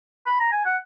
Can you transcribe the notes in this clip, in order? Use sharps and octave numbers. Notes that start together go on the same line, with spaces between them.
B5
A#5
G#5
F#5